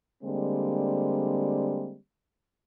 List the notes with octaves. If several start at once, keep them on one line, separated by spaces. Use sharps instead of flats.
D3 G3 G#3 A#3 C4